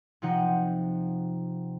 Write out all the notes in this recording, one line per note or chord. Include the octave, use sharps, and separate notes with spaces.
C3 F3 D#4 F#5 G6